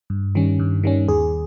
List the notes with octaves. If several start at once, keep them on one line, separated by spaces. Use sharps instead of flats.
G2
D#3 G3 C#4
G2
D#3 G3 C#4
D#2 G#4